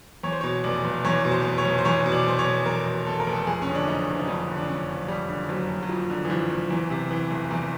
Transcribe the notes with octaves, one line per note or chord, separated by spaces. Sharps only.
E2 C#5
C5
B2 C#5
F1 D5
F1
E2 C#5
B2
C5
F1
C#5
F1
C5
E2 C#5
B2
D5
F1 C5
C#5
F1
E2 A#4
B2
F1 A4
A#4
F1
A4
F2 G#4
D3 C#4
D4
F#1 D#4
F#1
D#4
F2 D4
D3
D4
F#1 C#4
F#1
F2 G3
D3
F#1 F#3
F#1
F#3
F2 F3
D3
E3
F#1 F3
F#1
E2 E3
C3
E3
F1
E2